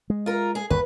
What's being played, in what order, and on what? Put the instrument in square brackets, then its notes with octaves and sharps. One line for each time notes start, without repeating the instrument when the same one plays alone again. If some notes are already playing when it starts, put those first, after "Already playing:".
[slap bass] G#3
[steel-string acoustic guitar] F4 A#4
G#4
[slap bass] G1 D#2 [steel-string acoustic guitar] B4